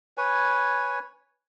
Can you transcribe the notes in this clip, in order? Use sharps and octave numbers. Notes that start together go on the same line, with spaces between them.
B4 C#5 G#5